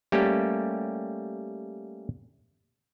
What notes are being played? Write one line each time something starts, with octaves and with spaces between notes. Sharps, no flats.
G3 A3 A#3 C#4 G4